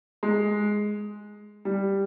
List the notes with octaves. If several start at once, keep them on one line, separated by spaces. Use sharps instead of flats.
G#3
G3